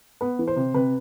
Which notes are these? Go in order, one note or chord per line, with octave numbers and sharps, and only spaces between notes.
B3 B4
E3
C5
C3
C3 B4